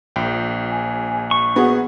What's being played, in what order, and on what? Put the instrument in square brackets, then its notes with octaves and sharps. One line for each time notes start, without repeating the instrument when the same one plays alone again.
[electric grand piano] A#1 G5
[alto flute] G#5
[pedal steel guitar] C#6
[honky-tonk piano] B3 F#4 G#4 [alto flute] F#5